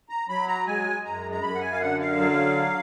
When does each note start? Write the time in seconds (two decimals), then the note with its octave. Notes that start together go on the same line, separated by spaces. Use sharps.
0.09 A#5
0.28 F#3 B5
0.47 A#5
0.67 G#3 G#5
1.05 F#2 A#5
1.31 A#5
1.42 F#2 B5
1.55 F#5
1.61 G#5
1.72 F5
1.80 D3 F#5
2.00 F5
2.18 F#3